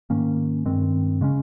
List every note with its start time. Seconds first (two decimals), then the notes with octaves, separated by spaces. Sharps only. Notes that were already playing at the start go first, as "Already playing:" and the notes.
0.10 G#2 D#3 A#3 C#4
0.66 G2 D#3 G#3 C4
1.21 C#3 G#3 C#4